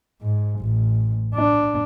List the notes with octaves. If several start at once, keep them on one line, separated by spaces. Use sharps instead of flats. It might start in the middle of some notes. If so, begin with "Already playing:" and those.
G#2
A1
D4